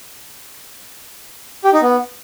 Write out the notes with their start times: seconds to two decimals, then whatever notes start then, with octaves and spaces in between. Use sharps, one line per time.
1.64 G4
1.73 D#4
1.82 B3